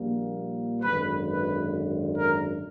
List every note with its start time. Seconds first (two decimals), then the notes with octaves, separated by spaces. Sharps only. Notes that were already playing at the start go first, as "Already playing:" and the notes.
Already playing: A#1 A#2 G3 A#3
0.82 G#1 F#2 D3 B4
1.26 B4
2.16 A#4